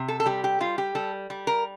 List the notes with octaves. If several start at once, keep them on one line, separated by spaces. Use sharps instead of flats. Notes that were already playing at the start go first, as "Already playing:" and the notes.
Already playing: C3
A4
A4
G3 G4
G4
G3 F4
G4
G3 A4
G3
A#4